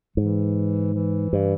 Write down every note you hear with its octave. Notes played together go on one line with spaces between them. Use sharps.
G#2 E3
E3
G2